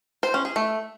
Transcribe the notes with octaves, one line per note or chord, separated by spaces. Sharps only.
C5
C#4
G#4
A3